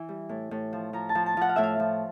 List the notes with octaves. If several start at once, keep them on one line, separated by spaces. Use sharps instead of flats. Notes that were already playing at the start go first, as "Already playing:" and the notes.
Already playing: E3
G3
A2
A2
F3
F3 A#5
A5
F3
A5
F3 F#5
F5
A2 E5
F5
F3